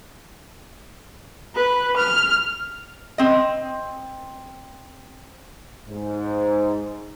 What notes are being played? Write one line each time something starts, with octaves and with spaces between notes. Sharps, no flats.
B4
F6
C4 D#5
G#2